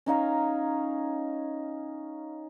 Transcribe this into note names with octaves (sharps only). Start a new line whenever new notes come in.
C#4 D#4 F5 A#5